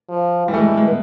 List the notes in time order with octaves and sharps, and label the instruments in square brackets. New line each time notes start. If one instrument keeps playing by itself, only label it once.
[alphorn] F3
[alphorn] E3 [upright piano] G3
[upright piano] A3
G#3
G3
G#3
B3